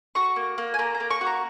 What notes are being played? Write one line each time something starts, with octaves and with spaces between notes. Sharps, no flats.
F#4 C#6
A#3
A#3
G#5
A#3 A#5
A#5
A#3
C#6
F#4
A#5